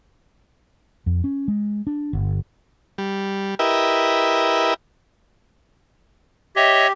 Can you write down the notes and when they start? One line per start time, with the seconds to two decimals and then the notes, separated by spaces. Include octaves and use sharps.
1.06 F2
1.24 C#4
1.48 G#3
1.87 D4
2.13 G1
2.98 G3
3.59 E4 G4 A#4 B4 D#5 E5
6.56 G4 C#5 D#5 E5